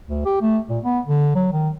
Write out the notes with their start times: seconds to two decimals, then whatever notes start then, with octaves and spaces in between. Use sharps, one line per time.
0.07 D2
0.25 G4
0.41 A3
0.69 A#2
0.84 B3
1.06 D3
1.35 F#3
1.53 D#3